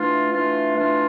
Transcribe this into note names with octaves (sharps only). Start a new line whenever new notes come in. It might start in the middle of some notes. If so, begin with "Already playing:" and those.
Already playing: E3 A3 D4 F4
E3 A3 D4 F4
E3 A3 D4 F4